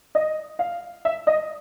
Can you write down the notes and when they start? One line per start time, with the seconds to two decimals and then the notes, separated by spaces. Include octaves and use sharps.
0.15 D#5
0.59 F5
1.05 E5
1.27 D#5